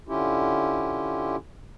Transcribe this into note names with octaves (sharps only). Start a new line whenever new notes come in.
D3 C#4 E4 F4 G4